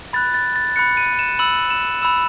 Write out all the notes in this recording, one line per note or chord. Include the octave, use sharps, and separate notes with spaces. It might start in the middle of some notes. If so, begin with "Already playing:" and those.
B5 F#6 A6
A6
A6
B5 F#6 C#7
D#7
E7
B5 E6 F#7
E7
B5 E6 E7